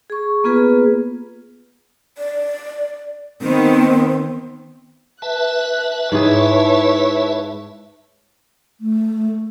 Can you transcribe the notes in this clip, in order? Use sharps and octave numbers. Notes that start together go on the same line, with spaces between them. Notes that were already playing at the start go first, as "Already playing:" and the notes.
G#4 C#6
A#3 B3 F4 G#4 B4
D5
D#3 B3 C4
B4 E5 A5 F#6
G#2 E4 G#4 C#5
A3